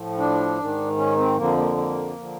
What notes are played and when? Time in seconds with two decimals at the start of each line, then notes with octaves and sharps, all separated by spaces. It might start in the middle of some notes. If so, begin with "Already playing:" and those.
Already playing: A2 F3
0.18 D4
0.58 G#2 D#3
0.97 C#4
1.18 C4
1.37 F2 D3 F3 A#3
1.57 A#3
1.77 A#3
2.17 D3 F3